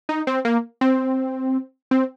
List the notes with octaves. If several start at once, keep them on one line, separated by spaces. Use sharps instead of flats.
D#4
C4
A#3
C4
C4